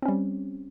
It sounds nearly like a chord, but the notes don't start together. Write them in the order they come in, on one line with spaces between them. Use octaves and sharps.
C4 C#4 G3